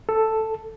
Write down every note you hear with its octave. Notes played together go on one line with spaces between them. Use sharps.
A4